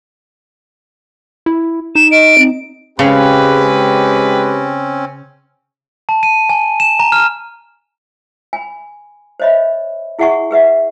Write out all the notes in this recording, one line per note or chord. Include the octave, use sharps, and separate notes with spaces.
E4
D#4 E7
D#5 D7
C4
C#3 G#3 C4 C#4 G4 B4
A5
D#7
G#5
E7
A#5
F6
G#5 B5
C5 C#5 D#5 E5 B5
E4 G#4 E5 F#5 G#5 C#6
G#4 B4 E5 F#5